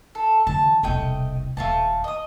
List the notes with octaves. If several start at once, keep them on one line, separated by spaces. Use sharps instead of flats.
A4
D3 E3 A5
E1 C2 A3 D#5 G5
D#1 D#2 A3 F4 A5
D#5 D#6